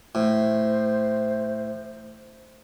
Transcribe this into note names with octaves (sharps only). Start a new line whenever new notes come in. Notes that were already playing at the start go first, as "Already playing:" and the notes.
A2 C5